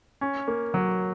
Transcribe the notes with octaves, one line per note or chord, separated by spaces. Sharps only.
C#4
A#3
F#3